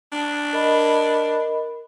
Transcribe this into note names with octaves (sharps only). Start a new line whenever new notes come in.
D4
A#4 D#5 B5